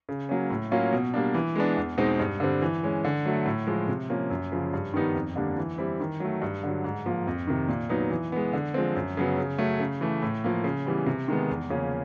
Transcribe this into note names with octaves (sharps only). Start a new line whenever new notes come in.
C#3
F#3 A#3 C#4
A2
F#3 A#3 C#4 F4
B2
G3 A#3 D4
E3
G#3 B3 D4
E2
B2 G#3 C4 D#4
G2
D3 G3 C4
E3
G#3 C#4
D3
F#3 A3
A2
F3 G#3
C3
F3 A#3 C#4
F#2
C#3 F3
G2
D#3 G3 B3 D#4
F2
D3 G3 A#3 D4
E3
G3 C4 E4
D#3
F#3 A3
G2
D3 F#3
G#2
F3 A#3
F2
C3 D#3
A#2
F#3 B3 D#4
E3
G#3 B3
D3
F3 G#3 C4
F#2
C#3 F#3 B3
C#3
F#3 A3 C#4
C#3
E3 A3
A2
F3 A#3
C#3
E3 G3 B3
C3
D#3 G#3 B3
E2
C#3 F3 A#3 C#4